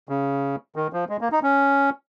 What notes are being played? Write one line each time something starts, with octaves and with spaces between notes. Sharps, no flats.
C#3
D#3
F3
G#3
A#3
D#4
C#4